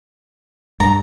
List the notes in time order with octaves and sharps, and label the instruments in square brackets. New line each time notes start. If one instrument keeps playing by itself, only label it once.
[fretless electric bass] G2 [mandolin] A#5